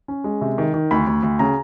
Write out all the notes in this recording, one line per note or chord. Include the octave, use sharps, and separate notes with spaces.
C#4
G#3
C3
D#3
D#3
D2 B5
D2
D2
C#3 A#5